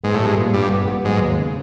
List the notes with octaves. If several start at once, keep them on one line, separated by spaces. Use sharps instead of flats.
G#2 B3
A2
G3
G#2
A#2
G2 A#2
B3
B3
G#2 F#3
D#2
C#3